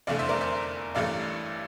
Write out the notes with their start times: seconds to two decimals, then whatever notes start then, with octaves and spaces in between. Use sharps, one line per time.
0.07 F1 E2 D3 A3 D5 F5
0.19 C5 E5
0.29 A#4 D5
0.41 C5 E5
0.95 A1 G2 E3 A3 D5 F5